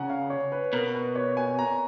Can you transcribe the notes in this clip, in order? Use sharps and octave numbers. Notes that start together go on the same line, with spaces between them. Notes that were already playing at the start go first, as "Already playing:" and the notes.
Already playing: C#3 F#5 G#5 A#5
F5
C#5
B4
B2 A#4
B4
C#5
G#5
A#5